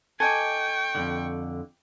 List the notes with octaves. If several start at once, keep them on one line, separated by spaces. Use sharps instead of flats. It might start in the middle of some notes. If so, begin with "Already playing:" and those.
A4 D#5 G5 G#5 C#6 D6
F2 G#2 D3